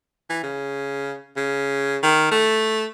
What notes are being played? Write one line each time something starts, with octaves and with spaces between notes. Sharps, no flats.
E3
C#3
C#3
D#3
A3